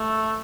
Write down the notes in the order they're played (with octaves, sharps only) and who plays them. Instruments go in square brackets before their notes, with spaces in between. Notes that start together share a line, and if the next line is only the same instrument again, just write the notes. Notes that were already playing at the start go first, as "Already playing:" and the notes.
Already playing: [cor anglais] A3